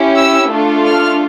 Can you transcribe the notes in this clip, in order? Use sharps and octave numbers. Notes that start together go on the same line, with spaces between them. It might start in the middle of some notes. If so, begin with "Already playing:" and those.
Already playing: C#4 E4 G4
E6
A3 D4 F4 A4
F6